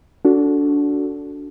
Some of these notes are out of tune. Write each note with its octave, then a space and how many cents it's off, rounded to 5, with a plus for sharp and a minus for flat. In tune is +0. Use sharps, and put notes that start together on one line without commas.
D4 -25 F#4 -10 A4 +0